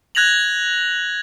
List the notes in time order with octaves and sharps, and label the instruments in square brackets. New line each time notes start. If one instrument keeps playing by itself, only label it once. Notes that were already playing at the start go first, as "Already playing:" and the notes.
[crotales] F#6 G#6 A#6 F7 F#7